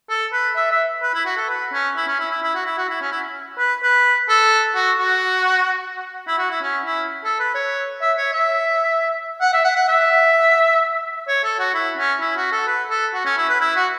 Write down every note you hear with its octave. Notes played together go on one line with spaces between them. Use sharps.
A4
B4
E5
E5
B4
E4
F#4
A4
B4
C#4
E4
C#4
E4
E4
E4
F#4
E4
F#4
E4
C#4
E4
B4
B4
A4
F#4
F#4
E4
F#4
E4
C#4
E4
A4
B4
C#5
E5
C#5
E5
F#5
E5
F#5
F#5
E5
C#5
A4
F#4
E4
C#4
E4
F#4
A4
B4
A4
F#4
C#4
E4
B4
E4
F#4